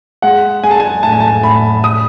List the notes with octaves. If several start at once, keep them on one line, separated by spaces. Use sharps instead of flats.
G#3 F#5
G#3 G#5
A5
G#5
A2 A5
G#5
A5
A2 B5
D#6